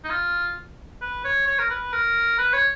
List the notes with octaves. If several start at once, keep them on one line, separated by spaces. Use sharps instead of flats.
D#4
F4
B4
C#5
C#5
A#4
B4
A#4
B4
C#5